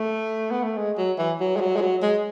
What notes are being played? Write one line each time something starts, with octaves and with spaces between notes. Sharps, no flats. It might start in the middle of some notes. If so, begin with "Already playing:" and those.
Already playing: A3
B3
A3
G#3
F#3
E3
F#3
G#3
F#3
G#3
F#3
G#3